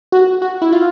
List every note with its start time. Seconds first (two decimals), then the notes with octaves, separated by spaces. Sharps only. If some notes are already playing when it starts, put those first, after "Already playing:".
0.12 F#4
0.42 F#4
0.62 E4
0.72 F4